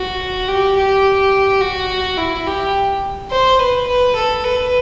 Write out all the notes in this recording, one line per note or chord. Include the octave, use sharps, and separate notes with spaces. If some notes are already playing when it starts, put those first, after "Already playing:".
Already playing: F#4
G4
G4
F#4
E4
G4
C5
B4
B4
A4
B4